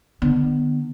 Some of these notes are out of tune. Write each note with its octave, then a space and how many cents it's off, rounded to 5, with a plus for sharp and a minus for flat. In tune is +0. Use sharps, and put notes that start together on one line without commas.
D3 +40 B3 +0